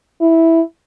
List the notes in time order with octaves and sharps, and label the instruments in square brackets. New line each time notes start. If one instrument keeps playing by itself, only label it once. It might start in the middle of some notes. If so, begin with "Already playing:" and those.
[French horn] E4